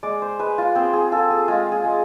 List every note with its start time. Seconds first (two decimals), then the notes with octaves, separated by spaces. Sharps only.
0.03 G#3 D5
0.22 C5
0.39 G#3 B4
0.58 F4
0.75 C4 G#4
0.93 G#4
1.12 F4 A4
1.30 G#4
1.48 G#3 F4
1.72 G#4
1.85 G#3